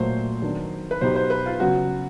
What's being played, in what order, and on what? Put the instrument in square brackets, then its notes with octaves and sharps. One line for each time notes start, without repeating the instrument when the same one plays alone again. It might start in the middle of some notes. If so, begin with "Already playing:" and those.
Already playing: [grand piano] A#2 F#3 A3 [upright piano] C5
[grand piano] D#3 F#3 B3 D4
[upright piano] B4
[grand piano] B2 F#3 B3 D#4 G4 [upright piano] C5
[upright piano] C5
B4
F4
[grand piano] C#3 F#3 B3 [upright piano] F#4